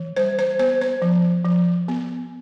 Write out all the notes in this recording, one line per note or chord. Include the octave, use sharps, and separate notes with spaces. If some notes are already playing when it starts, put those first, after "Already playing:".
Already playing: E3
G3 C5
C5
B3 C5
C5
F3
F3
B3